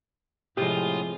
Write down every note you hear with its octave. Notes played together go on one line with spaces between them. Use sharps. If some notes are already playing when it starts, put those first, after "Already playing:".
A2 C3 F3 G#3 F4 G4 D#6